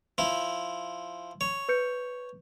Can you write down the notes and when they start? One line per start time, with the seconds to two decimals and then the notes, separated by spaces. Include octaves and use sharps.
0.18 F3 E4
1.41 C#5
1.69 B4 G6 C#7